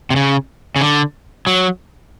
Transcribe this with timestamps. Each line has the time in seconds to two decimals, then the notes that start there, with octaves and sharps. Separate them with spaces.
0.10 C3
0.16 C#3
0.76 C#3
0.81 D3
1.47 F#3